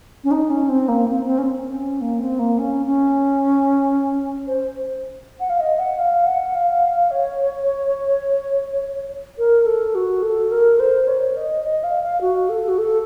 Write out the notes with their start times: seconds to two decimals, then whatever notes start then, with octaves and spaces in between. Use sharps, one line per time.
0.24 C#4
0.31 D#4
0.50 C#4
0.69 C4
0.88 A#3
1.06 C4
1.25 C4
1.38 C#4
1.45 C4
1.73 C#4
2.01 A#3
2.20 C4
2.39 A#3
2.59 C#4
2.86 C#4
4.47 C5
5.40 F#5
5.50 F5
5.60 D#5
5.79 F#5
5.99 F5
6.26 F#5
6.55 F5
7.11 C#5
9.38 A#4
9.66 A4
9.95 F#4
10.23 A4
10.51 A#4
10.80 C5
11.08 C#5
11.37 D#5
11.65 D#5
11.84 F5
12.03 F5
12.21 F#4
12.49 A4
12.69 F#4
12.78 A4